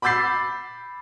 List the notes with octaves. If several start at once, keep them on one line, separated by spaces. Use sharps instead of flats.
B5 D6 E6 G6 A6 C7